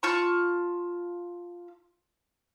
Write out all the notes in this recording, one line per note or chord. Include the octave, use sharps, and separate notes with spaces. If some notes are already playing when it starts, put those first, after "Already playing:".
F4 A5 C#6